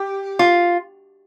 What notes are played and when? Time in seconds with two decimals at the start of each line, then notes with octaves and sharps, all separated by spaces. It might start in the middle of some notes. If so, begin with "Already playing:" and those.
Already playing: G4
0.39 F4